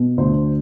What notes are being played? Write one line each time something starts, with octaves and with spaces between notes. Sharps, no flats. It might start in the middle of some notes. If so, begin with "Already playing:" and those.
Already playing: B2
D2 C5